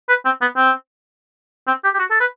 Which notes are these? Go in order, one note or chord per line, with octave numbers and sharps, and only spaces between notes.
B4
C4
B3
C4
C4
G4
G4
F#4
A4
B4